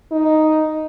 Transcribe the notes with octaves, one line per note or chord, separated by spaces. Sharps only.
D#4